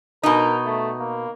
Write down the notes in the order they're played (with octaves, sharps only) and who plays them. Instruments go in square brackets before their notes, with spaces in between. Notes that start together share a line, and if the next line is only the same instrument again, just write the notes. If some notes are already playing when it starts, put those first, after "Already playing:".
[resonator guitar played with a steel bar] B2 D#4 [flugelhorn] A#4
[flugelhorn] A3
A#3